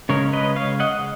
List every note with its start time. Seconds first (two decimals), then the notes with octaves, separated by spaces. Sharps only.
0.09 C#3 G#3 C#4 A#4 C#5
0.33 B4 D#5
0.56 C#5 F5
0.80 D#5 F#5